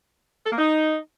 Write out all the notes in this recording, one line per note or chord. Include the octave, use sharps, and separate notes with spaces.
A4
A#3
D#4